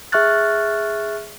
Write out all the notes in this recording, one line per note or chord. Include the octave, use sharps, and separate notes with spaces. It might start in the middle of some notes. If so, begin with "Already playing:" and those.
G#4 E5 C#6 F6 F#6 A6